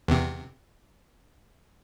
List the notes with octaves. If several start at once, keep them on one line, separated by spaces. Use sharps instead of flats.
E2 C3